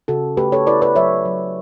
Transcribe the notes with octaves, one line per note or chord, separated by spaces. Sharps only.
C#3 F#4 A4
A3 G4 B4
A4 C#5
E4 B4 D5
B4 D5
F#3 C#5 E5
F#3